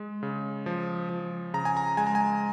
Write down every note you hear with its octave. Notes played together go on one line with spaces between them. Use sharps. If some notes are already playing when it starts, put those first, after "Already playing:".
Already playing: G#3
C#3
F3
F3
C#3 A#5
G#5
A#5
G#3 G#5
A#5
G#5